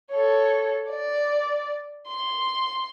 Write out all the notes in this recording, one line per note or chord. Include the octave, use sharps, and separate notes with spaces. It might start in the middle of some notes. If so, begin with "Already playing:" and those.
A4 C#5
D5
C6